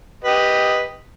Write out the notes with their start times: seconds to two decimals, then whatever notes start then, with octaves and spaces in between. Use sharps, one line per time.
0.25 G4 B4 D#5